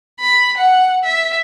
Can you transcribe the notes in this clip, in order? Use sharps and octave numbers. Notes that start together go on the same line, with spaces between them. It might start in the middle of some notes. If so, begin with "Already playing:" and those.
B5
F#5
E5